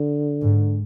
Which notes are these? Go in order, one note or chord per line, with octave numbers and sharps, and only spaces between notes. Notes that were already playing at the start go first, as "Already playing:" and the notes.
Already playing: D3
G#2